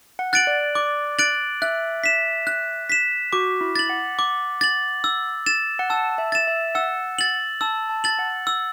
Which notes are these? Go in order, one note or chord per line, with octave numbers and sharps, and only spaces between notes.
F#5
F#6 A6 D7 F#7
D5
D6
F#6 A6 D7 F#7
E5 F#6
B6 E7
F#6
B6 E7
F#4 D6
E4
A6 F#7
F#5
D6
A6 F#7
E6
A6 E7
F#5
A5 E6
E5
A6 E7
E5
F#5 E6
A6 F#7
A5 E6
A5
A6 F#7
F#5
E6